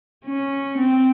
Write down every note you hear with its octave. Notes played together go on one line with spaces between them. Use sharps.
C#4
C4